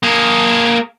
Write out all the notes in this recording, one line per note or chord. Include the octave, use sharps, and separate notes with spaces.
A#3 G#4